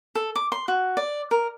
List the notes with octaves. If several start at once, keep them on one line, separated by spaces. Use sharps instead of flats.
A4
D6
C6
F#4
D5
A#4